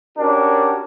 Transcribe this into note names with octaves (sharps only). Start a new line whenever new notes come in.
C#4 D4 F#4 G4 A#4